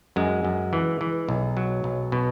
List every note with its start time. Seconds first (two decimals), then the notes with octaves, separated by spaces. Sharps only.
0.16 F#2 G#3
0.45 F#2
0.73 E3
1.01 E3
1.29 B1
1.57 F#3
1.84 B1
2.12 B2